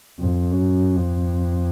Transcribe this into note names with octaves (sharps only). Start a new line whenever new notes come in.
F2
F#2
F2